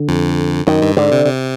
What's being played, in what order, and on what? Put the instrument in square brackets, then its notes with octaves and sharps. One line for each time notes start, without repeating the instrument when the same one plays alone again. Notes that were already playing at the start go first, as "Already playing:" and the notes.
Already playing: [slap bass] D3
[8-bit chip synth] F2
[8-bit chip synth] F#2 [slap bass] D#3
[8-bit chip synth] G2
[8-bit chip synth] G#2 [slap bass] D3
[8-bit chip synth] C3
C3